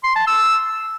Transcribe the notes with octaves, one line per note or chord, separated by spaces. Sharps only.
C6
A5
E6